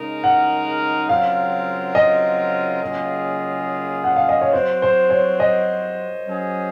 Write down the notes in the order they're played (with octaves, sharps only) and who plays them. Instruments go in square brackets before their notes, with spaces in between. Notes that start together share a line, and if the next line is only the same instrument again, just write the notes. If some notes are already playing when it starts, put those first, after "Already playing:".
Already playing: [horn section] C#3 G#3 D#4 A#4
[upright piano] F#5
[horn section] C#3 F#3 C4 F4 A#4 [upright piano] F5
[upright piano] D#5
[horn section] C#3 F#3 A#3 F4 G#4
[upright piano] F#5
F5
D#5
C#5
[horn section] F#3 C4 F#4 [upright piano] C5
[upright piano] C5
C#5
D#5
[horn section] F#3 C#4 G#4